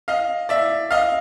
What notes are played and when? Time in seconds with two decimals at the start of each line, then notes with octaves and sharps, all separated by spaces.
0.08 D#5 F5
0.49 D5 E5
0.91 D#5 F5